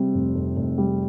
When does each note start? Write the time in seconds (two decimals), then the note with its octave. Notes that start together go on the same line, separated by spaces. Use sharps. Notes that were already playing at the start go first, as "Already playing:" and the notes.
Already playing: C3 G3
0.14 F1
0.35 F1
0.56 F1
0.78 G3